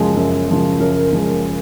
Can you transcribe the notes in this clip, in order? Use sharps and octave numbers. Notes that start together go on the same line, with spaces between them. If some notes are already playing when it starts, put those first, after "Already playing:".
Already playing: F#2 C#3 F3 G#3
F#2
C#3 F3 G#3
F#2 A#4
C#3 F3 G#3